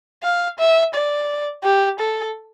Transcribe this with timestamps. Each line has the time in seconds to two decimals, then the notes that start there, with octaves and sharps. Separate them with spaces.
0.23 F5
0.59 E5
0.94 D5
1.64 G4
1.99 A4